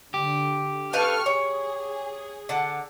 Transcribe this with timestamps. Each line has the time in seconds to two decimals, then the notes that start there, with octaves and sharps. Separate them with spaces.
0.14 D3 G4
0.93 A4 B4 F5 G5 C#6 F6
1.26 G#4 C#5
2.49 D3 F#5 A5